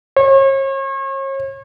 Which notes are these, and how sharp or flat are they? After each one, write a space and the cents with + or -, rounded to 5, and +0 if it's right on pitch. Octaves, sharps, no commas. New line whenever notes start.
C#5 -40